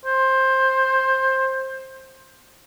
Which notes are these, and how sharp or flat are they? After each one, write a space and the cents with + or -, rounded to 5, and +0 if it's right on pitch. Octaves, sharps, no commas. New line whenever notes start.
C5 +15